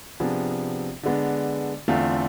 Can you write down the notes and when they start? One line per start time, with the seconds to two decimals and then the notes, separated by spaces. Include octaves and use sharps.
0.20 C3 F3 B3 D4 G#4
1.03 D3 G#3 B3 D4
1.88 E2 D3 A3 C4 F4